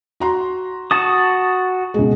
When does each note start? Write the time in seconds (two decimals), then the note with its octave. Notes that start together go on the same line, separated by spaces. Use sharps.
0.20 F#4 A#5 C6
0.91 F#4 A5 C#6 D#6
1.94 C#2 B2 G#3